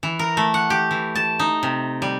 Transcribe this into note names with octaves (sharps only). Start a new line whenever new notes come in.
E3
A#4
A3
F#5
G4
E3
A5
D#4
C3
G3